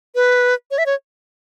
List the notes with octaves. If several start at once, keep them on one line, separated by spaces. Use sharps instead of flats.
B4
C#5
E5
C#5